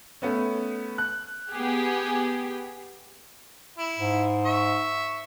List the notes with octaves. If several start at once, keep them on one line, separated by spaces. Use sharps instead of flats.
A3 B3 C#4
F#6
B3 G4 G#4
E4
G#2
E5 C#6